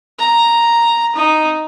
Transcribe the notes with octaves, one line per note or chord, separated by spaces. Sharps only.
A#5
D#4